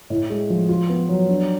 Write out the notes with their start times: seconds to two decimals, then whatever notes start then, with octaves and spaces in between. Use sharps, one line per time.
0.10 A2
0.30 G#3
0.50 F3
0.69 F4
0.90 B3
1.09 F#3
1.29 D4